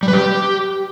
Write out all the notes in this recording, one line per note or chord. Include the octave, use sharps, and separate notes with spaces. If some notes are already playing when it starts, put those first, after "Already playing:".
G3
B4
G4